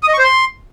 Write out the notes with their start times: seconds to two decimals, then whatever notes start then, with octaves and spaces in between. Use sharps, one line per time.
0.03 D#6
0.08 D#5
0.13 C#6
0.19 C5
0.24 C6